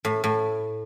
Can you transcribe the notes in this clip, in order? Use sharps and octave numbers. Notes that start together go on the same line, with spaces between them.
A2
A2